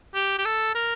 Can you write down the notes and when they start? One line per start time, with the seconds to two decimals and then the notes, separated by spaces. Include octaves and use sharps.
0.14 G4
0.39 G4
0.45 A4
0.75 A#4